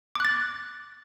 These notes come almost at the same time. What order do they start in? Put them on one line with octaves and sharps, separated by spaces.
D6 F#6 A6